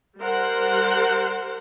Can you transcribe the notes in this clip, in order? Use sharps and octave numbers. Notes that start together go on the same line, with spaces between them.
G3 A#4 C5 F#5